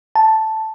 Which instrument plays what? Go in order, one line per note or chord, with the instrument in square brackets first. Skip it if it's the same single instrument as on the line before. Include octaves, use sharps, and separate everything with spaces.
[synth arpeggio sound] A5